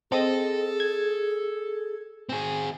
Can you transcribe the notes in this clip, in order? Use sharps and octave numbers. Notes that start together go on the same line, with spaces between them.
C4 G#4 A4 D#5 A#6
G#6
C4 G#4